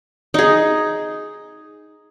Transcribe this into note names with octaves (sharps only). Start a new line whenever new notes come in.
D#4 G#4